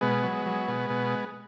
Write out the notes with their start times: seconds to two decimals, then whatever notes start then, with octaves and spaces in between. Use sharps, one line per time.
0.01 B2 G#3 B3
0.23 F#3
0.46 F#3
0.68 B2
0.90 B2